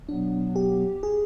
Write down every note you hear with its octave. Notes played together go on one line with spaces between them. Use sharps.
B2 F#3 B3 D4
G4
G#4